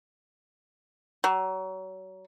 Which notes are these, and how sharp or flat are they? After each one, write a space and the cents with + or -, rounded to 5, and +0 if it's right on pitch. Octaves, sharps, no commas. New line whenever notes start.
F#3 +30